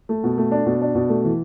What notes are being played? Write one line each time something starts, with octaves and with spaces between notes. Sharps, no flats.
A3
B2
A3
D4
B2
D4
B2
A3
E3